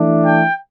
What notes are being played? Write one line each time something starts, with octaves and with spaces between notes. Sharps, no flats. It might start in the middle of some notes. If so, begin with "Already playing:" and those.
Already playing: E3 A3 D4
G5